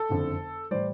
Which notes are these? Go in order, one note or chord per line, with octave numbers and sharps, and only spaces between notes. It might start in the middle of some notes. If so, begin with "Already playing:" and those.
Already playing: A4
F#1 F2 D3
A2 E3 G3 C5 D5